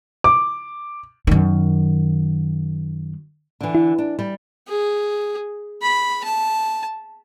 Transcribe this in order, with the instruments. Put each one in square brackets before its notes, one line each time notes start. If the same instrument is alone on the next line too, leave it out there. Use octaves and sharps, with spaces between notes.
[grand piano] D6
[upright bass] F#2 D#3
[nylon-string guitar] D3 E3
[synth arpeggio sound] E4
[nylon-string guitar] D4
G3
[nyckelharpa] G#4
B5
A5